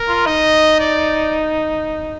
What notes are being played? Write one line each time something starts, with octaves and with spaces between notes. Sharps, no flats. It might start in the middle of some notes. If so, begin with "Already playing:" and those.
Already playing: A#4
F4
D#4 D#5
D5